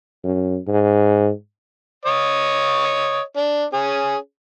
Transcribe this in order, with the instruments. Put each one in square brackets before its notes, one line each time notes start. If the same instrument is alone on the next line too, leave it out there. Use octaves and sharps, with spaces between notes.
[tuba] F#2
G#2
[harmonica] C#5 D#5
D4
C#4 G#4